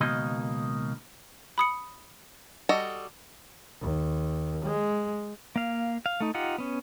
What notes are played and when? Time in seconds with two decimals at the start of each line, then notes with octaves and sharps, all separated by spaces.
0.01 C#2 B2 D#3 A#3 D#4 D#5
1.58 B5 D#6 C#7
2.69 G3 F#4 A4 D#5
3.81 D#2
4.66 G#3
5.56 A#3 F5
6.06 F5
6.20 A3 D#4
6.34 D#4 F4 G4 F#5
6.58 B3 C#4